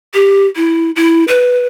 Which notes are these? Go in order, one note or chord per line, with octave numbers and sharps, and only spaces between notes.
G4
E4
E4
B4